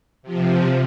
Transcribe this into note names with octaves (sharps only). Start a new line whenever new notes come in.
C3 F3